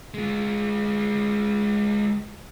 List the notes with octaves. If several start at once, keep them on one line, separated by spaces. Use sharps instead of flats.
G#3 F4